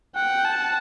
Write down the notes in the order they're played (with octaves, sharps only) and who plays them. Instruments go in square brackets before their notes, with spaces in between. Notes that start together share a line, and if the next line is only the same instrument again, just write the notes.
[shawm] F#5 [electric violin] G5
[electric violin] A5